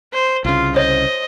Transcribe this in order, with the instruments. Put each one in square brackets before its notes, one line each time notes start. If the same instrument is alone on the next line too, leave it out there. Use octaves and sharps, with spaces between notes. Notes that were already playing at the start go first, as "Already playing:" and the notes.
[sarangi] C5
[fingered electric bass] C2 C#3 [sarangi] F4
[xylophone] C5 C#5 [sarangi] D#5